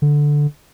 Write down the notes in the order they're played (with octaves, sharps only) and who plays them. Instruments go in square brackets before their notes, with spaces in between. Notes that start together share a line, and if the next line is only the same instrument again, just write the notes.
[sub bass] D3